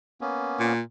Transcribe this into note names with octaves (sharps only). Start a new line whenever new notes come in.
A#3 B3 C#4
A#2